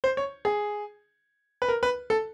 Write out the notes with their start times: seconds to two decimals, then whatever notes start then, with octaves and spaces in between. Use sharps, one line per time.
0.04 C5
0.17 C#5
0.45 G#4
1.62 B4
1.68 A#4
1.83 B4
2.10 A4